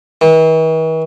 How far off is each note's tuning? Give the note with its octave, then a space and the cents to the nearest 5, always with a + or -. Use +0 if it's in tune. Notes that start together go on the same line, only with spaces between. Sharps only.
E3 -45